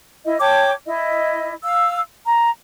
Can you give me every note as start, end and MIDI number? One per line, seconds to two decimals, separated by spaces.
0.25 0.37 64
0.25 0.37 75
0.40 0.72 73
0.40 0.72 79
0.40 0.72 81
0.40 0.72 86
0.85 1.53 64
0.85 1.53 75
1.62 2.01 77
1.62 2.01 88
2.26 2.49 82